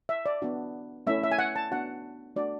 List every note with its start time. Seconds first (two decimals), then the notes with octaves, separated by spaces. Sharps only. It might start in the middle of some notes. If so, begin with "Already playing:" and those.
0.09 E5
0.26 D5
0.42 B3 D4 F#4
1.07 A3 C#4 E4 E5
1.24 E5
1.32 G#5
1.39 F#5
1.56 A5
1.71 B3 D4 F#4 F#5
2.36 A3 D4 F#4 D5